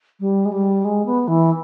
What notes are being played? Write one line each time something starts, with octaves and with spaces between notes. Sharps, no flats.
G3
G#3
G3
G#3
B3
E3